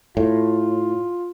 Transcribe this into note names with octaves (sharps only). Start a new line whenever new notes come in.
A2 F4